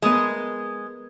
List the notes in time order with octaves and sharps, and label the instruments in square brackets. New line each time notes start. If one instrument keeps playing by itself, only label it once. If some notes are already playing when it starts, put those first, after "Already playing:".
[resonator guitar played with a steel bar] G#3 [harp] B3 A#4 D#6